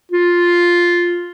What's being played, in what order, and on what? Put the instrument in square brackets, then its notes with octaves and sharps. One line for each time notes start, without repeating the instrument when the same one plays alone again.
[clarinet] F4